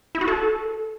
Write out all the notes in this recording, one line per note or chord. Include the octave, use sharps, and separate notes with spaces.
E4
F#4
A4